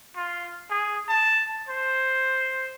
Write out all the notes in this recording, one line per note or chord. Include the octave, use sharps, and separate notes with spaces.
F4
G#4
A5
C5